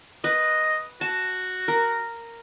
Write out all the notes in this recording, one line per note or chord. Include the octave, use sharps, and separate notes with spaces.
B4 D#5
F#4 A5
A#4